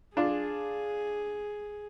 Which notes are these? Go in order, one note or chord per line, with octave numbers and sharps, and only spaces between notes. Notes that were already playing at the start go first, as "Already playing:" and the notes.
D4 F4 G#4